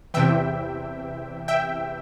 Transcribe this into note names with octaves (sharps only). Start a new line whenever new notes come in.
E2 C3 E3 E5 G5
E5 G5